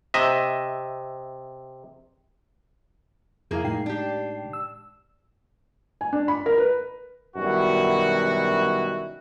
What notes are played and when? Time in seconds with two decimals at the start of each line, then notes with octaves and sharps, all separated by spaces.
0.14 C3 D#5 E5
3.51 F2 A#3 E4 G#4 F5
3.64 A2 G#3 D#4 G5 C7
3.86 D4 G4
4.53 E6
6.01 G#5
6.13 D4
6.28 B5
6.46 A#4
6.58 B4
7.36 F#2 B2 D#3 G3 E4 F#4